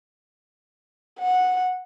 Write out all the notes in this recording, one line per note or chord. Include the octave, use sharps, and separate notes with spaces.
F#5